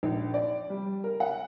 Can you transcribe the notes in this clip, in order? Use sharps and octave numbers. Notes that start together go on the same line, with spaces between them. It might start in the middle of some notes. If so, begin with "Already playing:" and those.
A#1
D5
G3
A#4
F#5